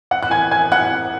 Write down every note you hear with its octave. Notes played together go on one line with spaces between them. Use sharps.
F#5 F#6
F#6
G#5 G#6
G#5 G#6
F#5 F#6